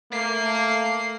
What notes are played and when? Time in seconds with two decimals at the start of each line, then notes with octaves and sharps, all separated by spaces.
0.12 A3 A#3 C7